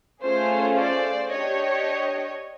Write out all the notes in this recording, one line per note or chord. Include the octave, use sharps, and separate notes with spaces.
A3 C#4 F4 G#4 C5
C5 D5
D4 G4 C#5 D#5